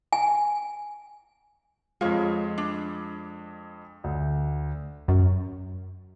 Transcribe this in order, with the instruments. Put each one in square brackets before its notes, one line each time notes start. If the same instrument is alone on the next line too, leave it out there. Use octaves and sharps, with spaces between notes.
[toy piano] G#5
[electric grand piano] F2 G#3 [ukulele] F4 C#5
[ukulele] D4
[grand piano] D2
[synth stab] F#2